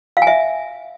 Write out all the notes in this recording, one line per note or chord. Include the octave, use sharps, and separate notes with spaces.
F5
G#5
E5